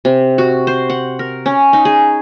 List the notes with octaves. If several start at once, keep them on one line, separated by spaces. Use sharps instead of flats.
C3
F#4
C5
F#5
A#4
C#4
D#4
G#4